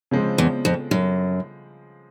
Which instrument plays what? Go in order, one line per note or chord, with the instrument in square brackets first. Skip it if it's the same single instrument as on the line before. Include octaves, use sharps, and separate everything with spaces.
[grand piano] C#3 F3 G#3 C4
[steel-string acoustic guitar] E2
F2
F#2